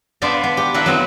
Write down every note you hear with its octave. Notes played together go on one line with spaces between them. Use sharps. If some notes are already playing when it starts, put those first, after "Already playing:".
B3 D4 C5 D5 F5 A5
B3
G4
D4 E4 A#4 B4 F5 F#5
F#3 B3 C4 E4